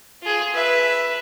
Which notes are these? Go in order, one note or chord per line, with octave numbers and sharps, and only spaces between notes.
F4 G#4
B4 E5